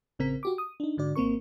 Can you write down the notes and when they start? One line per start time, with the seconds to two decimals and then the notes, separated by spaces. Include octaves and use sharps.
0.19 A1 C#3 C4 A#4 B6
0.43 F#4 G4 D6
0.58 D#6
0.80 D4 D#4
0.97 G#2 D3 F#4 D5
1.16 G#1 A#3 C4 A#4 C#6